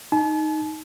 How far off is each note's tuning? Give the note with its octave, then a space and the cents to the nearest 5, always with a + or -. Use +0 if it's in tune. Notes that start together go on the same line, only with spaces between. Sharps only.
D#4 +0 A5 -45